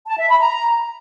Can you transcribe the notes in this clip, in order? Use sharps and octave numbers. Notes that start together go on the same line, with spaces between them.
A5
E5
B5
A#5